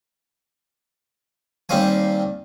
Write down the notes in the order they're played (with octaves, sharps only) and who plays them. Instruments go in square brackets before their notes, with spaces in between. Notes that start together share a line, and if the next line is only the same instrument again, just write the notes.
[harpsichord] D#2 G3 C4 F5 G#5